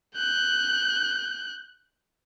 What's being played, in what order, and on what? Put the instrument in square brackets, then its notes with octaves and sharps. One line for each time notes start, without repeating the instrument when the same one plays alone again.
[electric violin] F#6 G6